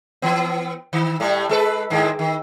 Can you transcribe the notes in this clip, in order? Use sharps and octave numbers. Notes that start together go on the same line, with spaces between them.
E3 B3
D#3
A2 G3 A3
G#3 A4 B4
G#2 D#3 G#3
D#3